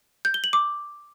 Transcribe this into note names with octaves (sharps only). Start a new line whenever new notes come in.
G6
G7
F#7
D6